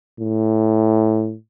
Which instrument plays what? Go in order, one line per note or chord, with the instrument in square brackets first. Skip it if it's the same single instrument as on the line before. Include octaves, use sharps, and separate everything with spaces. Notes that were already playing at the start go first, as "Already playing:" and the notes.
[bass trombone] A2